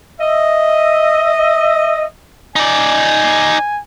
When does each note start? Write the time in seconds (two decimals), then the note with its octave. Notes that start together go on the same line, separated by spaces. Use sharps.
0.20 D#5 E5
2.56 D#4 D5 G#5